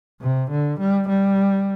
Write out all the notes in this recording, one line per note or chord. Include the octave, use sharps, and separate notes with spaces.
C3
D3
G3
G3